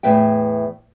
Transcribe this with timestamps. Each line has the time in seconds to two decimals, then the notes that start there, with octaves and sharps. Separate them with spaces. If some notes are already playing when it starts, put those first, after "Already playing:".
0.03 E2 A2 B4 E5 G5